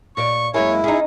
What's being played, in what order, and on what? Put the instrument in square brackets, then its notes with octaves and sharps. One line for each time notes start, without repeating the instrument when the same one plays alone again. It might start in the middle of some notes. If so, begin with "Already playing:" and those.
[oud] A#2 C#5 D5 [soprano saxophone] C#6
[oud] F#2 G#3 A#3 [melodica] E4 [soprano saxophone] C#5
[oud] C#4 D#4 [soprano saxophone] G#4